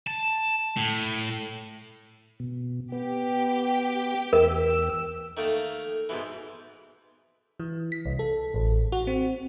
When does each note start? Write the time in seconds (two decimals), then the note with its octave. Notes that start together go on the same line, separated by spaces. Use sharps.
0.07 A5
0.77 A2
2.40 B2
2.92 B3 G4
4.33 E2 A#4 E6
5.37 D#3 A3 A#3
6.09 G#2 B2 E3
7.60 E3
7.92 B6
8.05 C2
8.19 A4
8.54 A1
8.92 F#4
9.07 C4